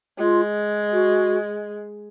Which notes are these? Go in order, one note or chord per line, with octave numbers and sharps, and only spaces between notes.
G#3 F4
F#4